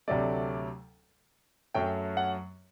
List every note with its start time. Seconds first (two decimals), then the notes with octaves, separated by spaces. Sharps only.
0.08 D2 C3 F#3 A3 D5
1.74 F#2 F#3 A3 G5
2.17 F#5